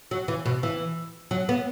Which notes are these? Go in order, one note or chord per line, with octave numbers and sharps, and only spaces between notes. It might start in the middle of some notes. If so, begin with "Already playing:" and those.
F#3
E3
B2
E3
F#3
B3